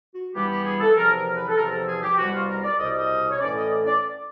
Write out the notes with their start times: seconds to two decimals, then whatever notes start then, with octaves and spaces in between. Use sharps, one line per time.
0.14 F#4
0.34 G2 E3 G3 B3 G4
0.50 G4
0.65 G#4
0.80 A4
0.96 E2 C3 F3 A#4
1.16 A#4
1.36 B4
1.48 A4
1.57 E2 C3 F3 A#4
1.72 A4
1.87 G#4
2.02 G4
2.18 C2 B2 G3 F#4
2.33 F4
2.48 A#4
2.63 D5
2.79 C2 B2 G3 D#5
2.98 D#5
3.31 C#5
3.40 A2 E3 A3 C#4 D5
3.55 D#5
3.70 D5
3.86 D5